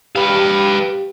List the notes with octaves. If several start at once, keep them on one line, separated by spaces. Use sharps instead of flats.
G4 B4 F5